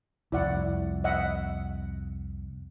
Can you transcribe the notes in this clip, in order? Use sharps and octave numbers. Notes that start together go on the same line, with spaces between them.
C2 F2 E4 D5 F#5
D#5 E5 F#5